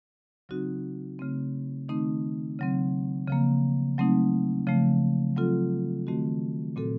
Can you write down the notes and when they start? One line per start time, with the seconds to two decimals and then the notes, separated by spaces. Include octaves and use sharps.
0.49 C#3 F#3 C4 D#4 F#4
1.19 C#3 A3 C4
1.89 D#3 A3 C4 D#4
2.59 C#3 F#3 C4
3.28 C#3 F3 A#3
3.98 F#3 A3 C4 D#4
4.67 C#3 F3 A3
5.37 F#3 C4 F4 A4
6.07 D#3 A3 C4 F#4
6.76 A#2 F#3 C4 F#4 A4